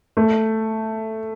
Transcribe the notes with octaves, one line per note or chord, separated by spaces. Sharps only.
A3